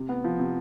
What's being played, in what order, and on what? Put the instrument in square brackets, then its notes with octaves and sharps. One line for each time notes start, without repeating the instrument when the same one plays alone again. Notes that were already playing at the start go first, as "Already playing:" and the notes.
Already playing: [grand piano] C3
B3
F3
C3